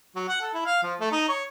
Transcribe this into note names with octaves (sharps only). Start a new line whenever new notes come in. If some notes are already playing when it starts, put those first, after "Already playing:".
F#3
F#5
A4
E4
F5
F3
A3
D#4
C#5